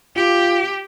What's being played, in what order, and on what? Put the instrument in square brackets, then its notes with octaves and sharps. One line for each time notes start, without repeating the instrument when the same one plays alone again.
[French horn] F4 [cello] G4